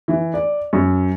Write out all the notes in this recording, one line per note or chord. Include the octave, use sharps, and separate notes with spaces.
E3
D5
F#2